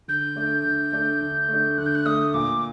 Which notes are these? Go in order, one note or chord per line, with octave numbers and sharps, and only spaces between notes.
D3 G6
A3 D4
D3
A3 D4
D3
A3 D4
D3 F#6
G6
F#6
A3 D4 D#6
A#2 D6